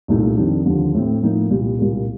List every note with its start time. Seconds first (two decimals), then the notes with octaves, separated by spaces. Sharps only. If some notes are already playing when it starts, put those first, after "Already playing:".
0.08 C2 A#2 A3 D#4
0.37 F2 D#3 G3 D4
0.65 D#2 D3 F3
0.94 A2 A3 C4
1.22 A2 F3 A#3 D#4
1.50 C2 A#2 G3
1.79 C2 A#2 G3 A#3